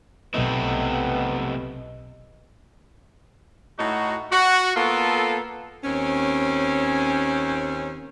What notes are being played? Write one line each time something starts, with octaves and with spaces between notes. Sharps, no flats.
B1 C3 A3 B3 E4 D#5
A2 A3 D#4 F#4
F#4
A#3 B3 F4 A4
D#2 C4 C#4